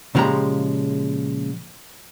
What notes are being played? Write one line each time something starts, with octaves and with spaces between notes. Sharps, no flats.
A#2 C#3 F3 G#3 G4 A#5